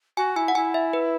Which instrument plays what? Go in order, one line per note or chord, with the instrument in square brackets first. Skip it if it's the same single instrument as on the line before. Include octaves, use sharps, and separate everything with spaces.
[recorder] F#4 [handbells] G#5
[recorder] E4 [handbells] G#5
[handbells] F#5
[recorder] E4 [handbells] G#5
[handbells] E5
B4